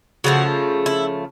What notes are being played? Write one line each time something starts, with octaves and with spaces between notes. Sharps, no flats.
C#3 F3 A3 F#4
E4